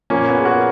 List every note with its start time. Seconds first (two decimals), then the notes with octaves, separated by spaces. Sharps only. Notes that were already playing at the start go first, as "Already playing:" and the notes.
0.10 A#2 F3 A#3 C#4
0.28 B3
0.37 G#4
0.45 F#4 A#4